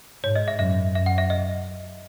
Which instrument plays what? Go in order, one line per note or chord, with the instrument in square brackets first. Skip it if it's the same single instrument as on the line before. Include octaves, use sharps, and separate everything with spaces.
[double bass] G#2 [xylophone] C#5
[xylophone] D#5
E5
[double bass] F#2 [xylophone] E5
[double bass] F#2 [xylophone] E5
[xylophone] F#5
E5
D#5